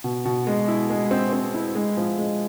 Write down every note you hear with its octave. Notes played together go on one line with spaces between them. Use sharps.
B2
B2
G#3
E4
G#3
C4
C4
E4
G#3
F3
G#3